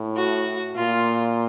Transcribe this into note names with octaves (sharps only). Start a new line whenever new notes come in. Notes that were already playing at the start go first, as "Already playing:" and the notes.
Already playing: A2
F#4
A#2 F4